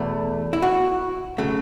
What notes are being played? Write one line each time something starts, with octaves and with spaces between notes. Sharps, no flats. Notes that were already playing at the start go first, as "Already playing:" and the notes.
Already playing: E2 B2 A3
E4
F#4
C#3 F#3 A3